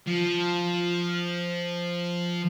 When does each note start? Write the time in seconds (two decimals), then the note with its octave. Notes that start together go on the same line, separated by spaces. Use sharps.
0.07 F3